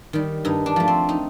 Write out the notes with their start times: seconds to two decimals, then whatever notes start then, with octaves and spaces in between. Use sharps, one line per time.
0.13 D#3 G3
0.45 G2 D#4
0.66 D4
0.76 F3 A3
0.88 C4
1.09 D#4